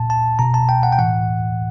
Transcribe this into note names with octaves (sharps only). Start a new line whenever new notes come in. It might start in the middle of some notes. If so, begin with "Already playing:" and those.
Already playing: A#2 A5
A5
B2 A#5
A5
G5
F#5
G5
A2 E3 F#5